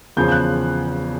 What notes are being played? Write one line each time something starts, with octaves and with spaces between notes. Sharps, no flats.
E2 C#3 F3 G6
G6
F#6